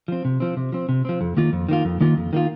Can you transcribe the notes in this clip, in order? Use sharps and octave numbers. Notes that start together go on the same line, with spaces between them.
F3 C4
C3
F3 C4
C3
F3 C4
C3
F3 C4
F2
D#3 A#3 F4
F2
D#3 A#3 F4
F2
D#3 A#3 F4
F2
D#3 A#3 F4